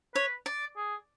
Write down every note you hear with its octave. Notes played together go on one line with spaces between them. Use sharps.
B4 C#5
D5
G#4